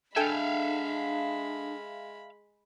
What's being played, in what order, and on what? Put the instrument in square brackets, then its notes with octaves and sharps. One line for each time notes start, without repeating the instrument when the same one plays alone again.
[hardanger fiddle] G#3 B5 [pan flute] D4 [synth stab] A4 G5 G#5 [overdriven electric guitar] E5 F5